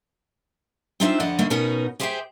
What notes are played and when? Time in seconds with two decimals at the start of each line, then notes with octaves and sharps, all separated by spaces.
1.00 C4 D4 D#4 F4 C5 E5
1.20 F2 D3 D5 D#5 F#5
1.39 D3 G3 A3 A#3 C4 D#4
1.50 B2 B3 C#4 D#4 F#4 A#4
2.00 G4 G#4 C5 E5 F5 G5